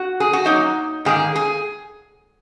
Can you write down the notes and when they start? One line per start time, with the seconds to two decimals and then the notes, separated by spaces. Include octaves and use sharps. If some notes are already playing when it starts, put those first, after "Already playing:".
Already playing: F#4
0.20 G#4
0.33 F#4
0.45 F#2 F#3 A#3 D#4
1.05 G#2 D#3 A#3 G#4
1.36 G#4